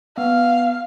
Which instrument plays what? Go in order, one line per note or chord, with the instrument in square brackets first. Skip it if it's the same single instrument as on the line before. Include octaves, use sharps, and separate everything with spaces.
[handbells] B3 [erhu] F5